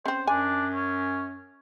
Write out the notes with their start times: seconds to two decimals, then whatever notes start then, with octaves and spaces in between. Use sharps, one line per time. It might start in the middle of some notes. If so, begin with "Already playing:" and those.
0.06 C4 C#4 C5
0.27 F#2 D4 G#5
0.74 C#4